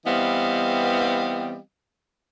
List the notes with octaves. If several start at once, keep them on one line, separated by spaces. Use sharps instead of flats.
E3 G3 B3 C4 D#5 F5